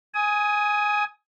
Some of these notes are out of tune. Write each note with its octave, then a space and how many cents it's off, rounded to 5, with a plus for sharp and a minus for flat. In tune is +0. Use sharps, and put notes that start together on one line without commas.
G#5 +0 D#6 +20